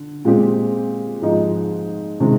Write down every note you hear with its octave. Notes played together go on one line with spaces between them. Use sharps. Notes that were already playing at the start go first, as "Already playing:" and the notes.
Already playing: D3
A#2 G#3 C4 G4
G#2 F3 G#3 D#4
C3 D#3 G#3